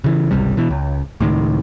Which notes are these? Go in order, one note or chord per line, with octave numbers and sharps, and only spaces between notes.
C#3 E3
G#1 C#2 C3 G3
B2 E3
C#2
C#2 A2 D#3